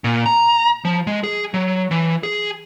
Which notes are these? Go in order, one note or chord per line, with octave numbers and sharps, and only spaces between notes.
A#2
A#5
F3
G#3
G#4
F#3
E3
G#4